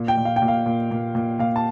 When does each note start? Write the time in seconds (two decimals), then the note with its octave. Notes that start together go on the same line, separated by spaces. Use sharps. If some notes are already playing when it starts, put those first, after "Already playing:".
Already playing: A#2
0.08 G5
0.17 A#2
0.25 F5
0.36 G5
0.42 A#2
0.48 F5
0.66 A#2
0.91 A#2
1.15 A#2
1.39 A#2 F5
1.56 A5